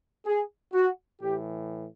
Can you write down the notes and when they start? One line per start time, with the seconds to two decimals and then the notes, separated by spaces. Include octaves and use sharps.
0.26 G#4
0.74 F#4
1.21 A2 E3 G4